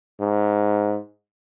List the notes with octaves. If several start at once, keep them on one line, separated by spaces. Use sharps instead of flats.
G#2